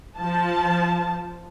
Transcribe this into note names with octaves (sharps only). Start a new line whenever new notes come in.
F3 A5